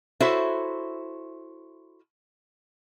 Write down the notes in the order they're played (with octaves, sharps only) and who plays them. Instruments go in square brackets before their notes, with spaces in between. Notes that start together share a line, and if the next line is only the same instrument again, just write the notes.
[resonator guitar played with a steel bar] E4 F#4 A4 C5 C#5 E5